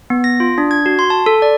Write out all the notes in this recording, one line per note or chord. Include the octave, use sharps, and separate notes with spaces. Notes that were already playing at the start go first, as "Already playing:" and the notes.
B3
A#6
F4
D4
G#6
F#4
C6
A5
A4
D5